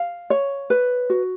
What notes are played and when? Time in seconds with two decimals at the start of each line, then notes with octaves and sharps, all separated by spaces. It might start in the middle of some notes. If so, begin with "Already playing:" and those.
Already playing: F5
0.30 C#5
0.70 B4
1.10 F#4